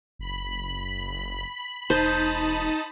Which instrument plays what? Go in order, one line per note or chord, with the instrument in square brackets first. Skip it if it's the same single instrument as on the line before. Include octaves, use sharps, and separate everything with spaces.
[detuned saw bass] F#1 [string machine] B5
[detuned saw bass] E1 [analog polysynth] D#4 A5 D#6 [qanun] C5